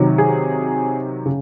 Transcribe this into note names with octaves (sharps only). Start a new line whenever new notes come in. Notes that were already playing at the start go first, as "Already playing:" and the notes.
Already playing: C3 D#3 F#3
G#4
C#3